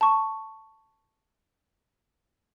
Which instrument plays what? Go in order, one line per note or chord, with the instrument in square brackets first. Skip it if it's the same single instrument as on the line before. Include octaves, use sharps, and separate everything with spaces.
[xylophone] A5 C#6